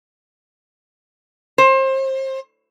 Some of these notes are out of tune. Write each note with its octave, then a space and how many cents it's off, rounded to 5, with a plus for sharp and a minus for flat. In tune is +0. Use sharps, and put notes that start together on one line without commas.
C5 +30